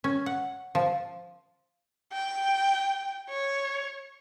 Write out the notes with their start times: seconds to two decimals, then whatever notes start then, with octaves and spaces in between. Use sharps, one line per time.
0.04 C#4
0.26 F#5
0.75 F3
2.13 G5
3.29 C#5